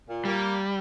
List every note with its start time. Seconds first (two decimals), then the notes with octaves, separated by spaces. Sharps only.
0.09 A#2
0.25 G3 A#3